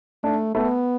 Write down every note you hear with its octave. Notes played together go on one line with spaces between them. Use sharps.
A3 D4
A3 B3